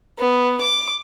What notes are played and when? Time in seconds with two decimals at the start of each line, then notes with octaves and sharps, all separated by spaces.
0.19 B3
0.61 D6